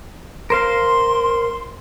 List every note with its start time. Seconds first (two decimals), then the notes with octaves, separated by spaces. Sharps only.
0.50 A#4 C5 F5 C6